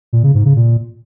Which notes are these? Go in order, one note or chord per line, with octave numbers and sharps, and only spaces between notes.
A#2
C#3
G#2
C#3
A#2